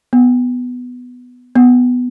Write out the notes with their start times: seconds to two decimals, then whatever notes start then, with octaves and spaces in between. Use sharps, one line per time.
0.13 B3
1.55 B3